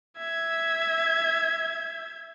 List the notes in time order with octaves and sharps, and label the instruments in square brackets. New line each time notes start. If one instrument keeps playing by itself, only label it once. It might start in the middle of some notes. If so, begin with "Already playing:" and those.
[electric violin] E5 G#6